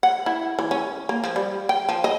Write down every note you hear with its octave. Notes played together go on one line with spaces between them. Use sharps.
F#5
E4
E3
C#4
A#3
F3
G3
G5
F3
D#5